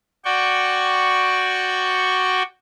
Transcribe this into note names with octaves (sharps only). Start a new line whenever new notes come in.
F#4 D5 G5 C#6